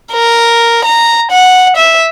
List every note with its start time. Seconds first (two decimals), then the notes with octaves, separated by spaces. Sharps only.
0.13 A#4
0.85 A#5
1.32 F#5
1.77 E5